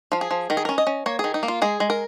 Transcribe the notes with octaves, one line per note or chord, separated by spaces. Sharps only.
F3 F4
G#4
F3
D#3 A#4
G#4
C#4 A#4
D#5
C#4
A#3 C#5
D#3 G#4
D#4
A#3
F4
G#3 G#4
G#3
A#4